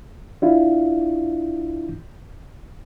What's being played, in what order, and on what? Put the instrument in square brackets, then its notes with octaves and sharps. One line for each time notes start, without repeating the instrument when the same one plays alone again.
[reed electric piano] D4 E4 F4